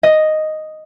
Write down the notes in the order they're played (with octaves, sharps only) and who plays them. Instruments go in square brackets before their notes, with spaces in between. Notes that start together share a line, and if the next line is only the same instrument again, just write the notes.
[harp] D#5